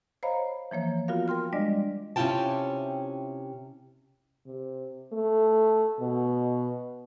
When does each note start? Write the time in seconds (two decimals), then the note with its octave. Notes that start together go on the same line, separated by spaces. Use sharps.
0.23 C5 C#5 D#5 F5 A#5 B5
0.71 E3 F3 A#3 C#5
1.08 B3 F4 F#4 A#4 F5
1.28 A#4 G5 C6 F6
1.53 G3 G#3 D4 D5 D#5
2.16 C3 C#4 E4 F4 G5 A5
4.46 C3
5.12 A3
5.99 B2